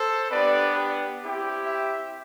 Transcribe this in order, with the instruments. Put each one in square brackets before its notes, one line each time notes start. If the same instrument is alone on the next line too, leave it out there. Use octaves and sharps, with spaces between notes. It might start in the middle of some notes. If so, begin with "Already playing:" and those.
Already playing: [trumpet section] A4 C5
B3 D4 G4 B4 D5
G4
C4 E4 G4
E5 G5